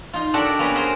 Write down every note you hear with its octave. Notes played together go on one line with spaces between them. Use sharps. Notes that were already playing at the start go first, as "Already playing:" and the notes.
D#4 F4
D4 F#4 G4 A4 A#4 D5
A#3 B3 C#4 B4
F#4 G#4 A#4 C5